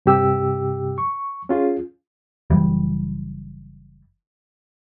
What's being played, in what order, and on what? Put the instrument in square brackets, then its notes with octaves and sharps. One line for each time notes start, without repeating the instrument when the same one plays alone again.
[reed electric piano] G2 C3 G4 E6
C#6
C#4 F4 G#4
[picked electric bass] F#1 E3 G3